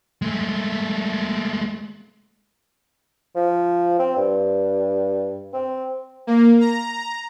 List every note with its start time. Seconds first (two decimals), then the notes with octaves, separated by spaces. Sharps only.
0.22 G#3 A3
3.36 F3
3.99 C4
4.16 G2
5.53 C4
6.27 A#3
6.61 A#5